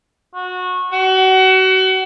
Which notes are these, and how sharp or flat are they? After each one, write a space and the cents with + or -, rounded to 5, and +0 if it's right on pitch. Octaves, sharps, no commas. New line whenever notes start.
F#4 -20
F#4 +30